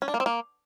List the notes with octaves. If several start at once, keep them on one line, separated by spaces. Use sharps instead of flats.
C#4
D4
A#3
C4
A#3